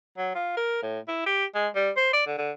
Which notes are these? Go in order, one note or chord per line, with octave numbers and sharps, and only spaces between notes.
F#3
F4
A#4
A2
E4
G4
G#3
G3
C5
D5
D3
D3